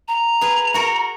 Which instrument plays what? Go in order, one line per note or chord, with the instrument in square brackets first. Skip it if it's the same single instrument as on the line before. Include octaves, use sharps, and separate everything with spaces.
[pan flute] A#5
[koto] G#4 B4
F#4 A#4